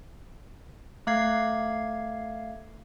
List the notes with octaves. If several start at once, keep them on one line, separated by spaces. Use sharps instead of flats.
A3 F5 G#6 C7